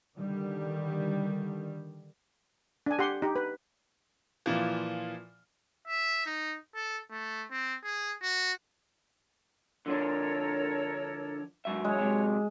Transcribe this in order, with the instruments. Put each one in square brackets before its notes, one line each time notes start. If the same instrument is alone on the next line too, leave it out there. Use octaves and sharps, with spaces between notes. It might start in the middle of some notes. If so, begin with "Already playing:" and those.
[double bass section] D3 D#3 G3
[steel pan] D4 G#5
G4 F#5 C6
D#4 G4
B4
[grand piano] A#2 E3 F3
[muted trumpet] E5
D#4
A4
A3
C4
G#4
F#4
[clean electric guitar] D3 F3 D4 [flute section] A4 A#4 C#5
[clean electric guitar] G#2 F#3 E5
[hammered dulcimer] G#3 [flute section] C#5
[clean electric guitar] C3 F#3